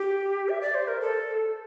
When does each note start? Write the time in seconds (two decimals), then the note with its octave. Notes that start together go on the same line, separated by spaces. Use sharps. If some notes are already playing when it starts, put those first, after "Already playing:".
Already playing: G4
0.49 E5
0.61 D5
0.75 C5
0.88 A#4
1.01 A4